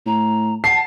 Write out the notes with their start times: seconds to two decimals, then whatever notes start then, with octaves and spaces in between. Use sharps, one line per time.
0.06 A2 A#5
0.64 F#5 A5 C7